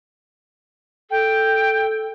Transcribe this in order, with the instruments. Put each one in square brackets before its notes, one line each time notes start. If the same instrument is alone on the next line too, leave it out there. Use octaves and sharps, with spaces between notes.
[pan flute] A4 [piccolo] G5